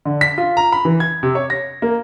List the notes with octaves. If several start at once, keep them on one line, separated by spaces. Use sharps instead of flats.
D3
B6
F4
A#5
B5
E3
G#6
C3
C#5
A#6
A#3